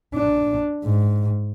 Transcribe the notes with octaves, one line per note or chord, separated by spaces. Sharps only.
D4
G#2